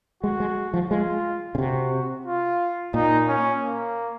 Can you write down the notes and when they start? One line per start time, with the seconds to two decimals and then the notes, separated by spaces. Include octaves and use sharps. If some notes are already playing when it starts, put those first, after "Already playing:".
0.23 G#3 F#4
0.40 G#3
0.74 F3
0.91 G#3 F4
1.55 C#3
1.58 C3 F#4
2.26 F4
2.94 A#2 D#4
3.28 C#4
3.62 A#3